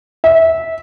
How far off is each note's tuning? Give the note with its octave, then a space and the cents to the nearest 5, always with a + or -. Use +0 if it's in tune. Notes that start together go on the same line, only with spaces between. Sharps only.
E5 -15